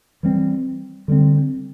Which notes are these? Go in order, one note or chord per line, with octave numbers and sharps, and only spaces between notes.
E3 G3 C4
D3 G3 C4